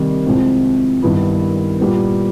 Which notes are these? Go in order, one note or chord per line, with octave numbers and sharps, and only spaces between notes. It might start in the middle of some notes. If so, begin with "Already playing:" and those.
Already playing: C3 D#3 G3 A#3
C2 C3 F3 G#3 C4
G2 D#3 G3 B3 E4
A#2 G3 B3